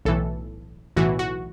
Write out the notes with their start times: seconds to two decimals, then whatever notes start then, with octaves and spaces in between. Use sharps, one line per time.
0.05 B1 A2 E3 A4
0.96 B1 A2 E3 F#4
1.19 F#4